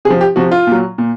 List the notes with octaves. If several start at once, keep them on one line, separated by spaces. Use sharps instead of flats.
C3 G#4
F3
G4
C3 F3 F#4
F4
A#2 F#3
A#2